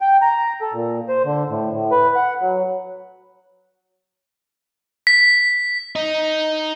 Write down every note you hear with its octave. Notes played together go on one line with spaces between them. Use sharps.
G5
A#5
A4
A#2
C5
D3
A2
A2
B4
F#5
F#3
B6
D#4